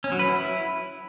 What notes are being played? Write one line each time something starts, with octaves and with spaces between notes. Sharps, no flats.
C#4
F#3
B4
E4